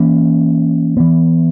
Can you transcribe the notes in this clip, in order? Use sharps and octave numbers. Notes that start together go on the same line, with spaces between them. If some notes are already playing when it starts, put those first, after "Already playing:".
Already playing: E3 A#3 C#4
E3 B3